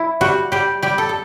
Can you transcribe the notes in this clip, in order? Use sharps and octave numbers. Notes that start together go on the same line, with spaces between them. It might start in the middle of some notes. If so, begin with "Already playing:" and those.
Already playing: E4
G3 F#4
G3 G4
G3 G4
A4
A4